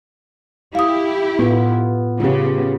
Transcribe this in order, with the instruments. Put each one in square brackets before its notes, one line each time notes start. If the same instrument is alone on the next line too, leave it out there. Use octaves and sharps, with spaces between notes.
[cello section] E4 G4 [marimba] F5 D#6
[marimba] A2 [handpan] B3 F4
[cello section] C#3 B3 [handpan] F4 G4